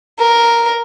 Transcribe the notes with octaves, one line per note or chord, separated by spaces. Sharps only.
A#4